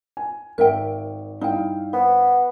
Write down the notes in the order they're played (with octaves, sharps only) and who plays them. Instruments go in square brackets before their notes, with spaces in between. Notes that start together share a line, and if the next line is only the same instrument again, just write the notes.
[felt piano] G#5
[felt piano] G#1 D7 [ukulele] A#4 E5 G5
[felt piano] G2 E4 F5 [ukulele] D#4 G5
[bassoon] B3 [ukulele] C5